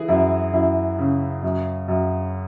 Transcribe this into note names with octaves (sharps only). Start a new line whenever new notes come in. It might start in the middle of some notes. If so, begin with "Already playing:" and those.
Already playing: E3 G#4
F#2 E4
F#2 E4
C#3
F#2
F#2